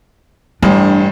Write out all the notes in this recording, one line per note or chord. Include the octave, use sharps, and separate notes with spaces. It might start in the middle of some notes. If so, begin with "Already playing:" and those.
A1 G2 D4